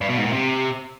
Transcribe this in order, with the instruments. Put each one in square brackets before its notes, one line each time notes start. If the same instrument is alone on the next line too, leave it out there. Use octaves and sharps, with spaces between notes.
[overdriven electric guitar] G2
B2
G#2
A#2
C3